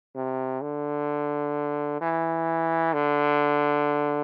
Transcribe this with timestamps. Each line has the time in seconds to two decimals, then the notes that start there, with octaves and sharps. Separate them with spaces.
0.16 C3
0.62 D3
2.01 E3
2.93 D3